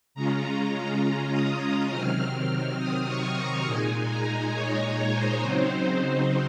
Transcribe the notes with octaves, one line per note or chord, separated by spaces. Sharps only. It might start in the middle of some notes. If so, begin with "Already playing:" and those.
C#3 G#3 C#4 F4 A#5
A#5
A#5
D#6
D#6
C3 D#3 F#3 C4 F6
F6
D#6
C#6
A#5
A#2 G#3 D#4 G#5
A#5
C#5
C#5
C5
C#3 F#3 C4 D#4